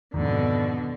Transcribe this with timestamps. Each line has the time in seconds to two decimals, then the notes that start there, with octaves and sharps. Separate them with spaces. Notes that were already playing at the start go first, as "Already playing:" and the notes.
0.14 F2 G#2 B2 D3 D#3